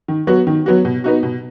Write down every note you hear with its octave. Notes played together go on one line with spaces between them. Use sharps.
D#3
F#3 B3 F#4
D#3
F#3 B3 F#4
B2
B3 D#4 F#4
B2